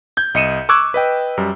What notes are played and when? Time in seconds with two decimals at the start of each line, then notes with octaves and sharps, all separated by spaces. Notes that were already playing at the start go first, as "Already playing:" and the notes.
0.17 G6 G#6
0.34 C2 D#5 C#7 D#7 E7
0.69 C#6 D6 E6 F#6 G#6
0.94 B4 D#5 G5
1.37 F#2 G3